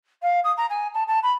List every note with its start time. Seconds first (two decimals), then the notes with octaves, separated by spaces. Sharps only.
0.22 F5
0.44 D#6
0.57 A#5
0.69 G#5
0.94 A5
1.08 A5
1.23 B5